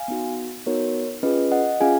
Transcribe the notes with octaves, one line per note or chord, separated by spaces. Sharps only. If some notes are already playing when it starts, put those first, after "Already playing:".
Already playing: F5 G#5
B3 D#4 F#4
B3 D#4 F#4 A#4 C#5
C#4 F4 G#4 B4 D#5
D#5 F#5
C#4 F4 G#4 F5 G#5